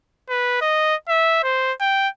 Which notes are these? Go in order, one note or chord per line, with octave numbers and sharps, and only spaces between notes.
B4
D#5
E5
C5
G5